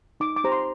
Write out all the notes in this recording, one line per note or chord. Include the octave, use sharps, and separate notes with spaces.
D#4 D6
D6
G4 C5 A#5
C6